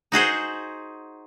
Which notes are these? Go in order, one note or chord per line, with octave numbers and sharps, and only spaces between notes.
D#4 F#4 G#4 C5